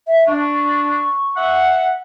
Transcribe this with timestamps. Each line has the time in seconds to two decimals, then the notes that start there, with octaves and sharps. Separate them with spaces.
0.08 E5
0.27 D4 C#6
1.36 E5 F#5